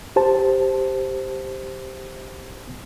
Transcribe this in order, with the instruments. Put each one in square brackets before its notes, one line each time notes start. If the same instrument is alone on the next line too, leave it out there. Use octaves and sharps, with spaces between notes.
[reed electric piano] G4 C5 A5